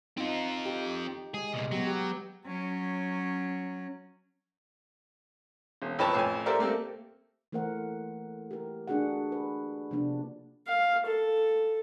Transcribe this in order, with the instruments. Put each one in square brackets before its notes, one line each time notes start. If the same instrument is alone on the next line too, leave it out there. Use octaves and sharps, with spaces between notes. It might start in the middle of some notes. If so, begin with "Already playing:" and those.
[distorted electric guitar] C4 F4 [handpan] D#4
[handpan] G4
[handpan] G#3 [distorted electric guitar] G#4
[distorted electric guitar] C2 A#2
[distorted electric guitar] F#3 [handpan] B3 G4
[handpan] G4
[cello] F#3 C#4
[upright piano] E1
F2 B4 C#5 A5
A1 F2 G#5
G4 A4 A#4 C5 D5 E5
A3 A#3 C4 G4 A4
[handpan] E3 A3 A#3 A#4 C5 F#5
G4 A#4
A3 D4 F#4 G#4 A#4 F#5
B4
C3 F3 A#3 B3 D4
[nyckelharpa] F5
A4